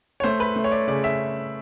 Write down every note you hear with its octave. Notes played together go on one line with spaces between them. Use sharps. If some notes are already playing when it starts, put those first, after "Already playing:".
C#5
A3 C5
B4
A3
C#5
D5
C#3 D5
E5